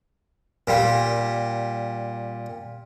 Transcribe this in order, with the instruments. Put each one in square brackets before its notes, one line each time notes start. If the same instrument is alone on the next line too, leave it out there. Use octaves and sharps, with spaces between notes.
[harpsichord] A#2 G3